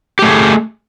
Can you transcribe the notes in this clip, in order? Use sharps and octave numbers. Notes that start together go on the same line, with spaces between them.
A3 G4 G#4